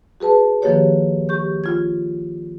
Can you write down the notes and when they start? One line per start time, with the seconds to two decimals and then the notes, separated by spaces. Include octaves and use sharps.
0.20 F#4 G#4 B4 A5
0.62 D#3 F3 A#3 F#4 G4 C#5
1.29 G4 C#6 G6
1.64 F4 G#6